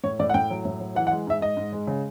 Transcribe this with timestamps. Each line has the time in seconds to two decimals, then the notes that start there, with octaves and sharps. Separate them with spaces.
0.04 A2 C#5
0.19 A2 D5
0.30 F#5
0.34 A2 G5
0.51 F#3
0.65 A2
0.80 F#3
0.95 E3 F#5
1.07 F#5
1.11 G#3
1.27 G#2 E5
1.41 G#2 D#5
1.57 G#2
1.73 G#3
1.87 C#3